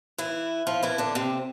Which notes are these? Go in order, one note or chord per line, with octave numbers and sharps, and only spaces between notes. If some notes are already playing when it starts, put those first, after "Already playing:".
E3 E4
F3 F4
E3 E4
D3 D4
C3 C4